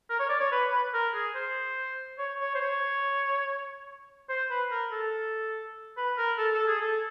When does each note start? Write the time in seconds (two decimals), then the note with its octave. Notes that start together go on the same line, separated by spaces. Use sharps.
0.10 A#4
0.19 C#5
0.29 D5
0.40 C#5
0.52 B4
0.73 B4
0.93 A#4
1.14 G#4
1.35 C5
2.18 C#5
2.41 C#5
2.55 C5
2.61 C#5
4.29 C5
4.50 B4
4.71 A#4
4.92 A4
5.97 B4
6.17 A#4
6.38 A4
6.53 A4
6.67 G#4
6.81 A4